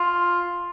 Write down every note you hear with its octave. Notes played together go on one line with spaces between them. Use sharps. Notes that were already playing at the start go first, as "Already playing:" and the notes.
Already playing: F4